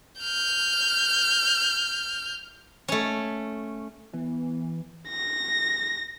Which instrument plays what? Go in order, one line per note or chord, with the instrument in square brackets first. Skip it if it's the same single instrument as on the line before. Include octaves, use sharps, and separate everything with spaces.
[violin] F6 G6
[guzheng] A3 C#4
[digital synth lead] E3 [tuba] B3
[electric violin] A#6